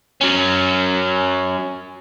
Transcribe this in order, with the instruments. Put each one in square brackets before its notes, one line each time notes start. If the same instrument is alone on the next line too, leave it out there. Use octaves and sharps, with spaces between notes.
[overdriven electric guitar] F#3 C#4